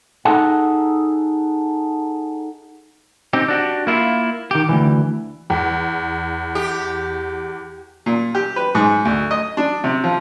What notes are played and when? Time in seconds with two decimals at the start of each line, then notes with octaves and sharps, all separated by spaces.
0.25 D#4 G#4 A4 F#5
3.33 C4 D#4 G4
3.48 D4 F#4 G4
3.87 A#3 E4 F4
4.51 D#3 G4
4.69 D2 G2 E3
5.50 E2
6.55 G4
8.06 A#2
8.35 G4
8.56 B4
8.75 G#2
9.05 D2
9.31 D#5
9.57 D4
9.84 C3
10.04 F3